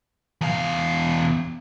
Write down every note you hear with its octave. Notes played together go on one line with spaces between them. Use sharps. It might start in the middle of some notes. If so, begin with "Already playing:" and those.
E2 F5